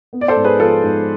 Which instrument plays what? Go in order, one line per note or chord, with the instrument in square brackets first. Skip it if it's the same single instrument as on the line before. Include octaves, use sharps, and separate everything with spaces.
[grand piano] B3
D5
A4 C5
G#2
G#4 B4
F3 F4 A4
G#2